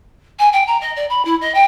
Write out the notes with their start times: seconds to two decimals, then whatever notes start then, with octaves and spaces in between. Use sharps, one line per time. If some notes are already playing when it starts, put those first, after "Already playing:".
0.39 G#5
0.52 G5
0.67 A#5
0.80 D#5
0.96 D5
1.09 B5
1.24 E4
1.41 D#5
1.54 G5